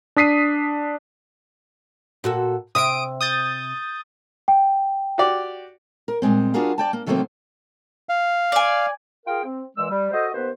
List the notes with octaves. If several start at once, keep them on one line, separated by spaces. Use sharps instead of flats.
D4 D#6 B6 C7 D#7
A#2 F#4 A4
C3 E5 D#6 D7
D#6 G6 A6
G5
F#4 G4 D5
A#4
A#2 G3 G#3 C4
D4 F4 F#4 G#4 A#4 F5
D5 G5 A5
A#3
C3 D#3 F#3 A3 A#3 C4
F5
D5 G#5
F4 G#4 A#4 F5 G5
C4
A#2 E3 G#3 E6
G3
F#4 A4 C5 D#5
D#2 B3 B4 C5